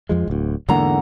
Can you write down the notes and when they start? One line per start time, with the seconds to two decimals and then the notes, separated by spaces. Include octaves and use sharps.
0.09 F2 F3 G#3
0.28 D1 D2
0.69 E2 G#2 D3 A#3 F#5 A#5